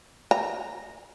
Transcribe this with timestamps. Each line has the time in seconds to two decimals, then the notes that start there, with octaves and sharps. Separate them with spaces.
0.31 A#5